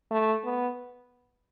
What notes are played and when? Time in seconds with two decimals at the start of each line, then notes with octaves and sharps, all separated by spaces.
0.11 A3
0.45 B3